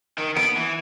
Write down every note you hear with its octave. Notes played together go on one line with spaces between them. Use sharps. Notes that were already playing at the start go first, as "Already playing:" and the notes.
D#3
B3 D7
E3